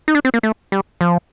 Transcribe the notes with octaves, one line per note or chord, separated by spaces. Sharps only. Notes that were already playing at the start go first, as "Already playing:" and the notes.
D#4
D4
C4
A#3
A3
G3
F3